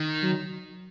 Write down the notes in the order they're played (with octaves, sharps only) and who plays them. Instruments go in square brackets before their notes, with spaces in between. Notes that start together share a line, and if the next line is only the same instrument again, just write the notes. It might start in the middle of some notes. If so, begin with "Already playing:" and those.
Already playing: [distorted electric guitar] D#3
[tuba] F#3